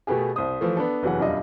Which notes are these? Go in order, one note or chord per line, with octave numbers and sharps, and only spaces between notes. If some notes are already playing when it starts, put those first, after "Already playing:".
B2 A3 B3 G4 G#4
C2 C5 D#6
E3 F3 A3
B3 D4 A4
F1 E3 F#3 G#4 F#5
E1 F#2 G3 D4 F4 D#5